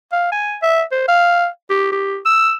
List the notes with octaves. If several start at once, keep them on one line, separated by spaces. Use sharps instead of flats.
F5
G#5
E5
C5
F5
G4
G4
E6